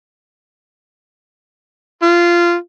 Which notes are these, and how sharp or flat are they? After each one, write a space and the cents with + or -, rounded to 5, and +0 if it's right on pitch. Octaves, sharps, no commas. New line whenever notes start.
F4 -15